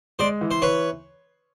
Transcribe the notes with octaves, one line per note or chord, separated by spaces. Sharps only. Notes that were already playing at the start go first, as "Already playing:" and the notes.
G#3 C5 D5
E3
C5
E3 B4 C#5